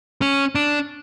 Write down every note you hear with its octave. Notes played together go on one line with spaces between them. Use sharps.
C#4
D4